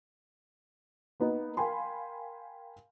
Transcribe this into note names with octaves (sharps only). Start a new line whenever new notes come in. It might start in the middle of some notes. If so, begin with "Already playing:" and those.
A#3 B3 D#4
A#4 F5 G5 G#5 B5 C6